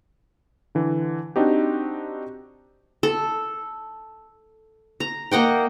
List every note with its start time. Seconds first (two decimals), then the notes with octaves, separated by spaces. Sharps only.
0.75 D3 E3
1.36 C4 D4 D#4 F#4 G4
3.03 A4
5.00 A#5
5.31 A#3 D#5 F#5 G5